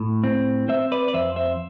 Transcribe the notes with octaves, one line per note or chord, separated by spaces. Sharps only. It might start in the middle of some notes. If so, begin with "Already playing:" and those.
Already playing: A2
C4
C4 C5 E5
B4 D5
D5
F2 C5 E5
C5 E5